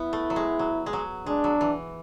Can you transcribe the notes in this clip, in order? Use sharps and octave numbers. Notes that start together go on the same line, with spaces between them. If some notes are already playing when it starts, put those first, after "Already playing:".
Already playing: B3 E4
A3
F#3
G#3
F#3
G#3
F#3
G#3 D4
F#3
E3